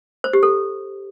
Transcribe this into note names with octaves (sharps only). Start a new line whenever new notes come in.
C5
G4
A4